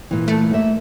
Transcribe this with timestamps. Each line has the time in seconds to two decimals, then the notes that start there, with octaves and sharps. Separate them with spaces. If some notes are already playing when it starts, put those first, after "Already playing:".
0.11 A#2 E3
0.28 A3
0.53 A#3 E5